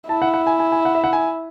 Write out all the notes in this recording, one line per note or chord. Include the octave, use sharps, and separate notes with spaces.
E4 A5
F#5
F#5
G#5
G#5
G#5
F#5
E5
F#5
G#5